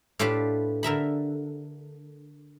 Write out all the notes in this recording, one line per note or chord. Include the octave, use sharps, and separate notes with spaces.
A2 D4 F4 G4 B4 A5
D3 A#4 E5 B5